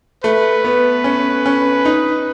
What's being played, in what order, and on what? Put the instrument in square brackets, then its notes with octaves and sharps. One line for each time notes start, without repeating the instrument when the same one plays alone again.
[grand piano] A3 [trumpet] B4
[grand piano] B3
C#4
C#4
D#4